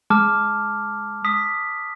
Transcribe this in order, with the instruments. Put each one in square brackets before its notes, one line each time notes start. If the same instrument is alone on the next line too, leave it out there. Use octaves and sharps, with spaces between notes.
[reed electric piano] G#3 [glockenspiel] A5 D6 F6
[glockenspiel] D#6 B6